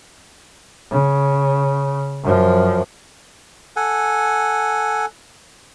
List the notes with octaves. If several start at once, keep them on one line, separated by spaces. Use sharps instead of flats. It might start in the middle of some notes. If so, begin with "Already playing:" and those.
C#3
F#2 F3
A4 F#5 G#5